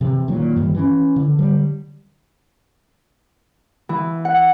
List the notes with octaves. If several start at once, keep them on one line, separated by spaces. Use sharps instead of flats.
C3 E3
D#1 D#2 A#2 F#3
G2 D#3 E3 G3
E3 C#4
D3
D3 F#3 G3
E3
F#5